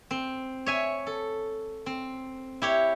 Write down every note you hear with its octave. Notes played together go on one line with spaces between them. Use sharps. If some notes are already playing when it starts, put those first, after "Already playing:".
C4
C#5 E5 G#5
A4
C4
E4 G4 C#5